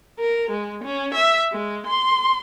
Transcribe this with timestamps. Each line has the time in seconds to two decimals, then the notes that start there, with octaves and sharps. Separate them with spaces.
0.19 A#4
0.51 G#3
0.84 C#4
1.14 E5
1.52 G#3
1.87 C6